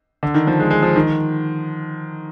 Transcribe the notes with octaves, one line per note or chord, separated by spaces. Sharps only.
D3
D#3
F3
G#3
G#3
F3
D#3